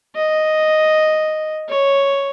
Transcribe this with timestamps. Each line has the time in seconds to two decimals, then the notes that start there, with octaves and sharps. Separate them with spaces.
0.16 D#5
1.69 C#5